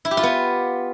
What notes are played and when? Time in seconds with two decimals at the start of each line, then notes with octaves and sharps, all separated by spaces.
0.05 E4
0.11 G4
0.17 F4
0.23 B3